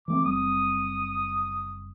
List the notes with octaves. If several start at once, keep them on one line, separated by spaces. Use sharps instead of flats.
E3 A3 C4 D6
F#1 G3 C4 D#6